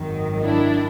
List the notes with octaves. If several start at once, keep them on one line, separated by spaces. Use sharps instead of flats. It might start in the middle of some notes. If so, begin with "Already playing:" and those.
Already playing: G#1 F#2 D#3 F#3
D4 E4